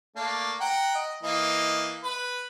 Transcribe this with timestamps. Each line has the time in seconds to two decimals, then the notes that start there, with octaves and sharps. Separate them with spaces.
0.16 A3 A#3 D4
0.60 F#5 G5 A#5
0.95 D#5
1.23 E3 A#3 D#5
2.04 B4